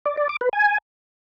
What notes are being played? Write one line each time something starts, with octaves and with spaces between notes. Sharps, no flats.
D5
D5
D6
B4
G#5